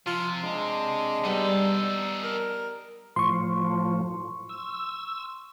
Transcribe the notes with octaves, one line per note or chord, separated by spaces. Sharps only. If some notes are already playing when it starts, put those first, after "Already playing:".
C3 F3 F4
G#3 D4
G3 B3 D#4 A4
A#4
A2 F3 C6 C#6
E6